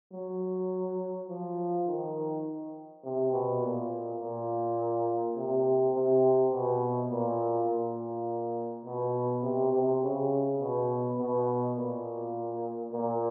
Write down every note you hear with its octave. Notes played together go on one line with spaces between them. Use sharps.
F#3
F3
D#3
C3
B2
A#2
A#2
C3
C3
B2
A#2
A#2
B2
C3
C3
C#3
B2
B2
A#2
A#2